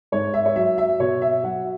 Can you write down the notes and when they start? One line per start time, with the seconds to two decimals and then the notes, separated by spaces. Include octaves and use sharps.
0.12 G#2 C#5
0.34 E5
0.46 C#5
0.56 F#3 E5
0.78 E5
1.00 B2 C#5
1.22 E5
1.44 F#3 F#5